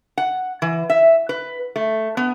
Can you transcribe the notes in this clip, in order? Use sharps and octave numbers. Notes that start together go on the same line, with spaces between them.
F#5
E3
E5
B4
A3
B3